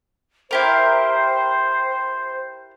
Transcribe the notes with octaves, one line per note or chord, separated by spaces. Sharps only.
E4 G4 A#4 C5